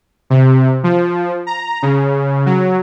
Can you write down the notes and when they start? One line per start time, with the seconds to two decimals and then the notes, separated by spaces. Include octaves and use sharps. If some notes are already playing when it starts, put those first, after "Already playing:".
0.30 C3
0.84 F3
1.47 A#5
1.82 C#3
2.46 F#3